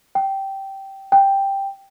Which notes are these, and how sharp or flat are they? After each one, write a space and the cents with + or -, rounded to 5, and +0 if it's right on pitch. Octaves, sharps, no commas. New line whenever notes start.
G5 -10
G5 +5